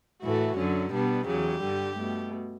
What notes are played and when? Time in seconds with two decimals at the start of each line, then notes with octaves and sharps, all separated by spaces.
0.23 A2 E3 A3 F#4
0.57 F#2 D3 F#3 C#4
0.93 B2 G3 B3 D4
1.27 E2 C#3 F#3 G4
1.63 G2 D3 G3
1.98 B2 A3